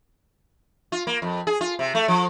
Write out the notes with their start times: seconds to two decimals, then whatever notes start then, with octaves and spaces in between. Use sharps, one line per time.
0.92 F4
1.07 A#3
1.22 F2
1.47 G#4
1.61 F4
1.79 C3
1.95 A3
2.08 F3